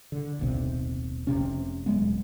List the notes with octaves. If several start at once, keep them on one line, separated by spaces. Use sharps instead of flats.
D3
D#1 B1 C3
F1 C2 C3 C#4
D#1 F#3 G#3 B3